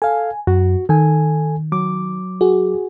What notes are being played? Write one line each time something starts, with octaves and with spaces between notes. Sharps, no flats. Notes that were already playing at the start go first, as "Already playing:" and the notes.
A4 F5 G#5
F#2 F#4
D#3 A4 G#5
F#3 D6
F#4 G#4